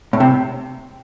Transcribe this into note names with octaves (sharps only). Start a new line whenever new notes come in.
A2
C3